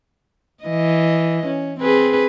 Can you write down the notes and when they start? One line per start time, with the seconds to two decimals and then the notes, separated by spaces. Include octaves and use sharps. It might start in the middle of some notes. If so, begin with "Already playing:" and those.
0.64 E3 D#5
1.47 C#4
1.80 C4 G#4 B4